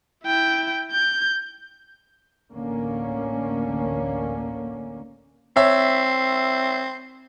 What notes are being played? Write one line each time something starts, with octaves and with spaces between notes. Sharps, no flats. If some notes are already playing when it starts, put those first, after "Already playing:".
E4 G5
G6
A1 D2 D3 A#3 C#4
C4 C#5 E5